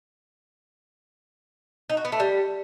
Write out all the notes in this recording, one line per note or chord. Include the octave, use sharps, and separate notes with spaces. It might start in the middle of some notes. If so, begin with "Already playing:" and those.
D#4
F#4
B3
A3
G3